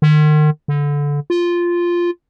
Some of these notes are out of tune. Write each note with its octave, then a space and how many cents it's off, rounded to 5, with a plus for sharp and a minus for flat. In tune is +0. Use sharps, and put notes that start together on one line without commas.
D#3 -40
D3 -20
F4 -5